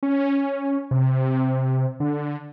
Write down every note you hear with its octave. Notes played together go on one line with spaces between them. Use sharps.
C#4
C3
D3